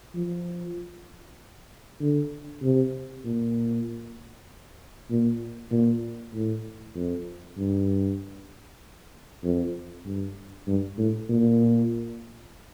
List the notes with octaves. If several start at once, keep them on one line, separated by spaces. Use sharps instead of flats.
F3
D3
C3
A#2
A#2
A#2
A2
F2
G2
F2
G2
G2
A2
A#2